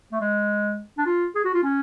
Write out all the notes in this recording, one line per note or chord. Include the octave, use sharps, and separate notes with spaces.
A3
G#3
D4
F4
G#4
F#4
F4
C#4